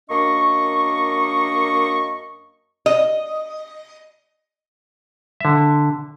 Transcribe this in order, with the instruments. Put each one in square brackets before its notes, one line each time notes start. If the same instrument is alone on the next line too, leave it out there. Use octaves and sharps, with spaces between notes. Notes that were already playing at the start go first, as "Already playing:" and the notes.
[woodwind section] F#2 A#3 D4 D#5 C#6
[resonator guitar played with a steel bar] D#5
[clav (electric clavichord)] D3 E5